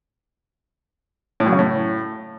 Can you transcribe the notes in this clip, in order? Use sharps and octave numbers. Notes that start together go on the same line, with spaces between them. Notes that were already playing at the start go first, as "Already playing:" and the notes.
A2
F#2
C#3
A2